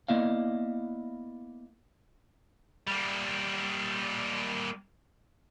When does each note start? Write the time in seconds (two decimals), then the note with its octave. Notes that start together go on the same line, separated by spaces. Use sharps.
0.08 A#3 B3 E4 D5 D#5 F5
2.87 G3 A#3